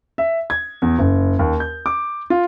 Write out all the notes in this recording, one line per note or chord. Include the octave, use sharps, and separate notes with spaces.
E5
G#6
E2
F#1
D#2
G6
D6
F4